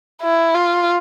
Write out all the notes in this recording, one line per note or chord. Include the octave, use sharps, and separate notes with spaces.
E4
F4